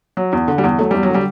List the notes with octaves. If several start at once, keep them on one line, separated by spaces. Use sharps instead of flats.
F#3
E2
D3
G3
E2
F#3 A3
E2 G3
F#3
D3 G3